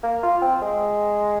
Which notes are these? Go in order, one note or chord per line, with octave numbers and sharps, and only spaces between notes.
A#3
F4
C4
G#3